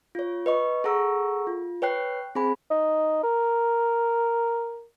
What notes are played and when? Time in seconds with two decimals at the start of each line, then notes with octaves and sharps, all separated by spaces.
0.15 F4 C#5
0.46 B4 D#5 C#6
0.84 G#4 A4 F#5 A#5 C#6 E6
1.47 F4
1.82 B4 C#5 G5 F#6 C7
2.35 C4 G#4 C5 G#5 B5
2.71 D#4
3.23 A#4